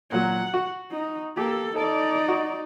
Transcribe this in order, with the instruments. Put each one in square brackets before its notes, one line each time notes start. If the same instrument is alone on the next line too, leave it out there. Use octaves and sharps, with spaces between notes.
[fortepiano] A#2 F#3 [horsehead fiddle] F#5
[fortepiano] F#4
[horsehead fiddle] D#4
[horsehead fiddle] A#3 A4 [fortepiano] G4
[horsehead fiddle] D#4 D5 [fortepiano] A4
[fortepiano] F#4